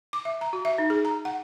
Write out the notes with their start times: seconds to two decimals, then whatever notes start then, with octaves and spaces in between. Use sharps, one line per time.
0.13 D6
0.25 E5
0.41 A#5
0.53 F#4
0.65 E5
0.78 D#4
0.90 G#4
1.05 A#5
1.25 F#5